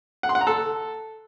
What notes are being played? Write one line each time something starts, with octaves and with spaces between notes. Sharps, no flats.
F#5
C6
F#5
A#5
A4